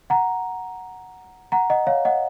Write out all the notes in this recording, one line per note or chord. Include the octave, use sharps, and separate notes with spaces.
F#5 A#5
F#5 A#5
D#5 F#5
C#5 F5
D#5 F#5